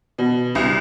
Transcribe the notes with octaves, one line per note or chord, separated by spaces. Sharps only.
B2
C2